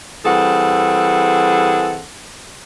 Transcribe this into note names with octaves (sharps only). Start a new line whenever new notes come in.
E3 G3 C4 G#4 A4 F#5